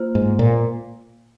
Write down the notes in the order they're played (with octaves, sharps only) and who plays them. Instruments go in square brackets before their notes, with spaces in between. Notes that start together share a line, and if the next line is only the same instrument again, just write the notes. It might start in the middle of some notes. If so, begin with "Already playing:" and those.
Already playing: [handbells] A#3 F4 C5
[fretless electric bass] G#2
A#2